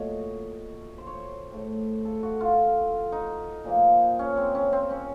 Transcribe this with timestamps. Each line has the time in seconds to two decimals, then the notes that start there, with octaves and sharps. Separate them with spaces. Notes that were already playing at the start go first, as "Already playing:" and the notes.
Already playing: A#2 F#3 A3 C#5 D#5
0.98 C5
1.07 C#5
1.15 C5
1.51 A2 A3
2.05 A4
2.23 F#4
2.41 F4
3.12 D#4
3.65 A#2 F3 A#3
4.19 C#4
4.37 C4
4.55 C#4
4.73 C4
4.90 C#4